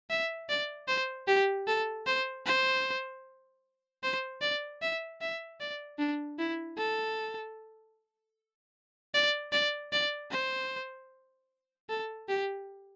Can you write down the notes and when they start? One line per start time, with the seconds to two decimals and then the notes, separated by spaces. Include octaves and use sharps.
0.10 E5
0.49 D5
0.88 C5
1.27 G4
1.67 A4
2.07 C5
2.46 C5
4.03 C5
4.41 D5
4.82 E5
5.21 E5
5.60 D5
5.99 D4
6.39 E4
6.78 A4
9.14 D5
9.52 D5
9.92 D5
10.31 C5
11.89 A4
12.29 G4